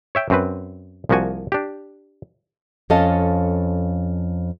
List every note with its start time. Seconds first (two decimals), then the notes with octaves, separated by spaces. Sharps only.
0.15 C#5 E5 G5
0.30 F#2 C4 B4
1.09 C2 F3 A#3 F#4 G#5
1.52 D4 G4
2.90 F2 C#4 A4 D#5 F5 A5